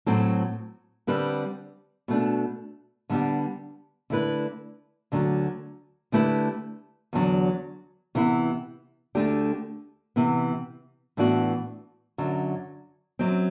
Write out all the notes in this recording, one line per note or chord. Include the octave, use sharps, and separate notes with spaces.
A2 F#3 C4 F#4 A4
D3 G3 C4 G4 B4
B2 A3 D4
D3 G3 B3 D4 G4
D3 A3 E4 B4
D2 D3 F#3
D3 A3 E4 G4 B4
E2 D3 F#3
C3 E3 B3 E4
D2 D3 A3 D4 G4
C3 E3 B3
A2 E3 B3 D4 F#4
F#2 D3 F#3
F#2 F#3 C4